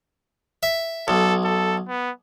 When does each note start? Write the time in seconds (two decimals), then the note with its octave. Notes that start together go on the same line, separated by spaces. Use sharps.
0.63 E5
1.08 B1 A4
1.44 A4
1.88 B3